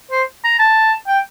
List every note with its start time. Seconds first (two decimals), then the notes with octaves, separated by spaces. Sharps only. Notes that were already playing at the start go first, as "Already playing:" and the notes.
0.11 C5
0.44 A#5
0.59 A5
1.07 G5